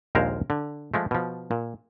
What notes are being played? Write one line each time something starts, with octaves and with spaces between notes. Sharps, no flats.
A#1 D#2 G#3 A#4 C5 F5
D3
F3 G#3 A3
B2 F3
A#2